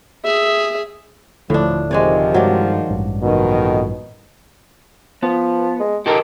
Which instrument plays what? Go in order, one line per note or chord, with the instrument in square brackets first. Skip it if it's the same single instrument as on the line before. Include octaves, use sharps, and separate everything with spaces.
[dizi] G#4 [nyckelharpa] E5
[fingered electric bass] D#1 D3 [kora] A2 D4 [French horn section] F3
[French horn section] G#2 D#3 F3 [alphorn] C3 [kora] G#3 C#5 D5
[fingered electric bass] G2 G#3 [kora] F#3 D5
[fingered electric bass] A1 G2 G#3
[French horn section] F2 D#3 [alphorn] B2
[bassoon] F3 [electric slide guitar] B3
[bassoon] G#3
[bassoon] D#3 [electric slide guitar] G4 A4 A#4